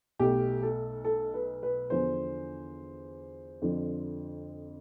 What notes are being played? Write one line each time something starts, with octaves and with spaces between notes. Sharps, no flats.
B1 B2 A3 G4
A4
A4
B4
B4
E2 D3 F3 C5
F2 D3 F3